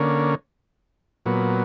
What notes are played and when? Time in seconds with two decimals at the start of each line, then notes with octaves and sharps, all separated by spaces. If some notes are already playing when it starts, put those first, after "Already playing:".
Already playing: D3 A#3 C#4
1.26 A#2 F#3 B3